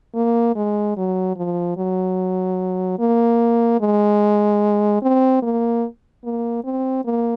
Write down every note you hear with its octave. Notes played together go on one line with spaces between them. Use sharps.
A#3
G#3
F#3
F3
F#3
A#3
G#3
C4
A#3
A#3
C4
A#3